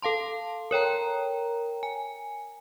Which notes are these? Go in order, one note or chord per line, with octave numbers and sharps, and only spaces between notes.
A4 F5 A5 C6
A#4 C#5 G5 A#5
G#5